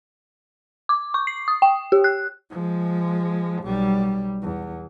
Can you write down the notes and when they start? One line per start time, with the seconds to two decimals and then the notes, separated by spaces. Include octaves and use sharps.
0.89 D6
1.14 C#6
1.27 C7
1.48 D#6
1.62 G5
1.92 G4
2.04 F#6
2.50 F3 G#3
3.63 B1 G3
4.42 E2